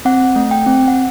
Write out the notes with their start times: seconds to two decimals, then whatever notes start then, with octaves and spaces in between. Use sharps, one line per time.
0.05 C4 F#5
0.36 A3
0.51 G5
0.66 C4
0.88 F#5